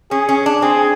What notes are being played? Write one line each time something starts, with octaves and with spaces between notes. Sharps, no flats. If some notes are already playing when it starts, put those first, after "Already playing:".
C#4 G#4
C#4
D4
C4 G#4